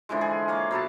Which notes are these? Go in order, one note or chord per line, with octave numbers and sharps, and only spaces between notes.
D3 E3 F3 G#3
G#4
A#3 C#5 F5
B2 F#3 B4 A5